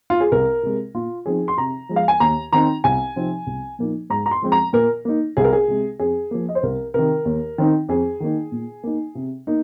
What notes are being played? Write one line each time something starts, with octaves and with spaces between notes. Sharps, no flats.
F4
G#4
C2 A#4
C3 G#3
A#2 F4
F3 C4 D#4 G#4
C6
C3 A#5
F3 G#3
F5
G#5
D#2 A#5
D#3 C4 D#4 A#5
C2 G#5
C3 F3 C4 D#4
C2
A#2 F3 A#3 D#4
G#2 A#5
A#5
C6
F3 G#3 C4
A#5
A#2 A#4
A#3 D#4
C2 G#4
A#4
G#4
C3 G#3
F2 G#4
F3 A#3
D#5
C5
C2 A#4
C3 D#3 A#4
D#2
D#3 C4 D#4
F2 G#4
D#3 A#3 D#4
A#2
A#3 D#4
C3
A#3 D#4